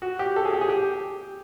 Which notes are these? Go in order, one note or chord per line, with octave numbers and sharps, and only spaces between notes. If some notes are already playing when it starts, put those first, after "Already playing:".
F#4
G4
A4
G#4
G4
G#4
G4